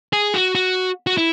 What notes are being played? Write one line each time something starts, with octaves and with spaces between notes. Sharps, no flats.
G#4
F#4
F#4
F#4
E4